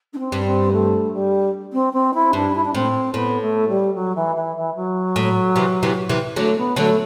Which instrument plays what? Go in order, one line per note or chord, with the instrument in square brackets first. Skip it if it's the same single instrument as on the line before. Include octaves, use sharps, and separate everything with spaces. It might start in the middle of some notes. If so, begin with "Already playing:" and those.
[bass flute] D4
C4
[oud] G2
[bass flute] C4
A3
G3
C4
C4
E4
[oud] G2 [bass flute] D4
[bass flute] E4
D4
[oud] A2 [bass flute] C4
[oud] A2 [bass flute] B3
[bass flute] A3
G3
F#3
E3
E3
E3
F#3
[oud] A2
C3 E3
C3 E3
C3 E3
[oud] D3 F#3 [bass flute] A3
[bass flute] B3
[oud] D3 F#3 [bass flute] A3